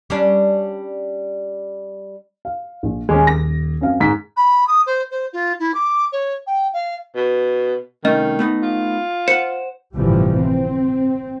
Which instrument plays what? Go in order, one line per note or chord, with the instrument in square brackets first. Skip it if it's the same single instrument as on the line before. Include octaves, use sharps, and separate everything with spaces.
[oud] G3 C#4 D4
[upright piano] F5
A#1
[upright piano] D#1 D6 [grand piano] G#3 C#4
[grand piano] A#6
[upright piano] F#2 C4 F5
[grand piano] G#2 B6
[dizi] B5
D#6
C5
C5
F4
E4
D6
C#5
G5
F5
[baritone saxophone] B2
[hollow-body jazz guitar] C2 A3 C#4 [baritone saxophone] D#3 [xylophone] D#5
[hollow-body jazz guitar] A3 B3 D#4
[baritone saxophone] F4
[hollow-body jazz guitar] C5 F#5 [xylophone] C#7
[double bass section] G1 A2 C3 E3 F3 G3
C4